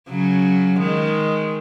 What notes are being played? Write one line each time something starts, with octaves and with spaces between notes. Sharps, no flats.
C#3 F#3
D#3 G#3